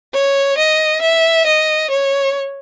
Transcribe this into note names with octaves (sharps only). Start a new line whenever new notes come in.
C#5
D#5
E5
D#5
C#5